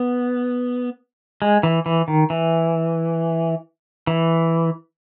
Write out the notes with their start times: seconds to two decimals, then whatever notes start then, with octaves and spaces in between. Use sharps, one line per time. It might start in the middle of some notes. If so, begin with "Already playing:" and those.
Already playing: B3
1.42 G#3
1.63 E3
1.86 E3
2.08 D#3
2.30 E3
4.07 E3